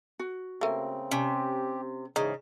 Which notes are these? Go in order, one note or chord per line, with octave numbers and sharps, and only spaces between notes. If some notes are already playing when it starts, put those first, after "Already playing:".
F#4
C#3 A3 A#3 C4
C3 C#4 G4
G#2 C#3 E3 D#4